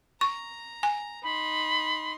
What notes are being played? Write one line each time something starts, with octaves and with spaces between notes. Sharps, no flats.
A#5 C#6
G#5
D#4 B5 C6